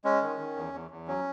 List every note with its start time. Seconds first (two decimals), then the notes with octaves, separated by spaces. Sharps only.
0.05 G#3 C#4
0.22 D#3
0.39 D#3
0.56 E2
0.73 E2
0.91 E2
1.07 F#3 C#4